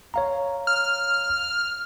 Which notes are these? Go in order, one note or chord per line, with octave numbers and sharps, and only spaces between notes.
C#5 F5 A#5
F6